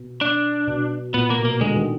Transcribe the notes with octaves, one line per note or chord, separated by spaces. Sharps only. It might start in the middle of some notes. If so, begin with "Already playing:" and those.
Already playing: B2
D4
B2
A#2 B3
A#3
B2
A#3
D3 G#3
D#3